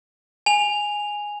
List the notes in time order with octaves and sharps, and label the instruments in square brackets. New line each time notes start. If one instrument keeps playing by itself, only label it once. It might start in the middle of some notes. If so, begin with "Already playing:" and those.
[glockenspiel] G#5 F7